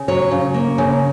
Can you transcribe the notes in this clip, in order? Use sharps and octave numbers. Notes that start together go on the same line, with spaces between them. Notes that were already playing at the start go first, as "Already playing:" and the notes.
Already playing: C#3
F#3 C#5
C#3
A#3
C#3